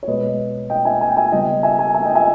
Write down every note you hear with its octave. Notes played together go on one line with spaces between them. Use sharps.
C#5
B2 G#3 B3 B4 D#5
D#5 G5
E5 G#5
G#5
G5
E5 G#5
C#3 G3 B3 D#5 G5
E5 G#5
E5 G#5
E5 G#5
D#5 G5
E5 G#5